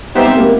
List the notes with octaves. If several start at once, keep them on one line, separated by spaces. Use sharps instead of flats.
B3 D#4 G4 C5 E5
C4
A#3